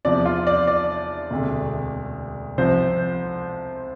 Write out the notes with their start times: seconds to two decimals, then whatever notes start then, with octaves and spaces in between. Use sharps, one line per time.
0.05 E2 C3 F3 D5
0.25 F4
0.47 D5
0.67 D5
1.31 E1 D2 C3
2.57 C2 C3 F3 C5